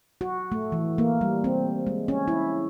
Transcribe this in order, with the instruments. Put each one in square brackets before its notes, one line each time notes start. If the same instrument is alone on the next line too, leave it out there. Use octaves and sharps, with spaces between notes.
[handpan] F#4
A3
E3
A#3
G3
C4
G#3
C#4
E4